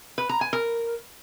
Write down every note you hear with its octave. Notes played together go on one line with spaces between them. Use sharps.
B4
A#5
G#5
A#4